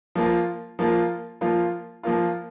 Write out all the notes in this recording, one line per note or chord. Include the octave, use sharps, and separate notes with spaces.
F3 A#3 F4
F3 A#3 F4
F3 A#3 F4
F3 A#3 F4